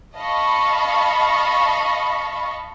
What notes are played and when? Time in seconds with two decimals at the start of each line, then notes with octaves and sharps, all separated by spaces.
0.17 D#5 F5 A5 B5 C#6